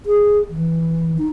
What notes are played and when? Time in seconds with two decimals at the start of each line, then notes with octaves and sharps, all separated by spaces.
0.06 G#4
0.50 E3
1.18 D#4